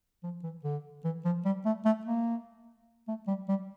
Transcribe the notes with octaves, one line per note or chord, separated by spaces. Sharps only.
F3
E3
D3
E3
F3
G3
A3
A3
A#3
A3
G3
G3